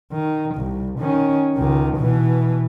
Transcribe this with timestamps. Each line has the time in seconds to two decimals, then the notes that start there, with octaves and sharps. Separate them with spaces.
0.13 D#3
0.55 C2
0.99 D#3 C#4
1.56 C#2 D#3
1.97 B2 E3